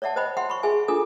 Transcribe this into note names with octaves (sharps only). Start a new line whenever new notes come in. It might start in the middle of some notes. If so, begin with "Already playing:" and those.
C#5 D5 E5 F#5 A5
C5 D#5 G5 B5
E5 F#5 G5 C6
B5 C#6
G#4 E5 G#5
D4 F4 A4 G#5 D#6